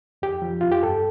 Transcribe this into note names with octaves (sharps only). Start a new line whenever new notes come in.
F2 G4
F3
F2 F4
G4
G2 A4